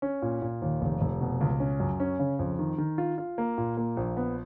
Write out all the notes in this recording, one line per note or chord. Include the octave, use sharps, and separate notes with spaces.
C#4
A#2
A#2
D#2
F1
F1
B2
C#2
C#4
F#2
C#4
C#3
F2
D#3
D#3
F4
F4
A#3
A#2
A#3
A#1
B3